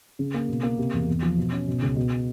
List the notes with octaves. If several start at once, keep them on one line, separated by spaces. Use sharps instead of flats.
C#3
A#3
B2
A#3
C3
E2
E2
F3
B2
C#4
B2
C#2
B2